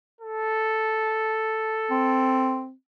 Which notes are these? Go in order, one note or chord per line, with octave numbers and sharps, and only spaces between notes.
A4
C4